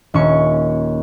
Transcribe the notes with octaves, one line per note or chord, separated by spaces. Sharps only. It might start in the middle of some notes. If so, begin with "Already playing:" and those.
D#1 C#4 C#6